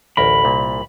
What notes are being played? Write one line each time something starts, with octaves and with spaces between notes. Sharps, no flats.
A1 D2 A#4 B5
C2 A#2